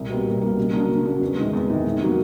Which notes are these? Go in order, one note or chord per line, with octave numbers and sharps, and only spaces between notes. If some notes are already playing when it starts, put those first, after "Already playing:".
Already playing: C2
B2 G3 A#3
C2
B2 G3 A#3
C#3
F#3 A#3 D4
C#3
F#3 A#3 D4
E2
C3 D#3 G#3
E2
C3 D#3 G#3
C3
D#3 F#3 A#3